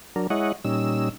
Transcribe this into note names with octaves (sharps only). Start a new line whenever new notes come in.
F#3 D4 A#4
G#3 E4 C#5 D#5 F#5
A#2 G3 C#4 D#4 E6